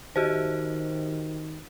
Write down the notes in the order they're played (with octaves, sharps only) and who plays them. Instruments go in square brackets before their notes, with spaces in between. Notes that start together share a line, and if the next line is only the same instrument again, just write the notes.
[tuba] D#3 [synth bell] F#4 G4 C5